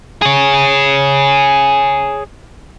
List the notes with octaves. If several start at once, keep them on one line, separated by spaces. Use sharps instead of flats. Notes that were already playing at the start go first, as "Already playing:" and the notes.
G#4 C#5